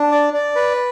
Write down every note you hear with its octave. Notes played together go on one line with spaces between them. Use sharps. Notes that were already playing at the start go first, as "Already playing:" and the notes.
Already playing: D4
D5
D5
B4